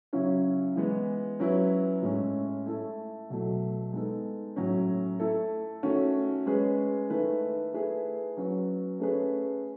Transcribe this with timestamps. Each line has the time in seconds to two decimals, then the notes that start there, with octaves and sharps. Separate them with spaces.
0.13 C#3 F#3 C#4 E4
0.76 E3 G#3 B3
1.40 F#3 C#4 E4 B4
2.02 A2 G#3 C#4
2.66 A3 E4 A4
3.30 B2 F#3 A3
3.93 G#3 B3 D#4 A4
4.56 A2 F#3 C#4
5.20 A3 E4 A4
5.83 D#3 A3 C#4 F#4
6.46 G#3 C#4 G#4 B4
7.10 D#3 A3 E4 B4
7.73 A3 E4 G#4 B4
8.37 F#3 C#4 F#4 B4
9.00 A3 C#4 G#4 B4